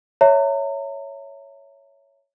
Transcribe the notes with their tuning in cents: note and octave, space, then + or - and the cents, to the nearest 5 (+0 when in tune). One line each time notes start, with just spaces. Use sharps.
C#5 +5 E5 +0 A#5 -35